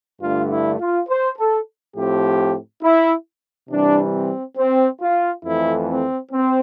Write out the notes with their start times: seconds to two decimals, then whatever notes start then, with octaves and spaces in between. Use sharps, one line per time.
0.22 G2 D3 A3 F4
0.51 E4
0.79 F4
1.09 C5
1.38 A4
1.96 A2 F3 C4 G4
2.83 E4
3.70 C3 E3 G3 D4
4.13 C4
4.57 C4
5.01 F4
5.44 F2 E3 A3 E4
5.88 C4
6.32 C4